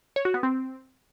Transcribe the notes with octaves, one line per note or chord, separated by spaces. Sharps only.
C#5
F#4
B3
C4